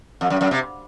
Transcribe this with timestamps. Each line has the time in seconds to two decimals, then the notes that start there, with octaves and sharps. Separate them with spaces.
0.21 F2
0.30 F#2
0.41 F#2
0.51 C3